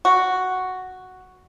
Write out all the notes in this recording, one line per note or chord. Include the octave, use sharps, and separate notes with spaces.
F#4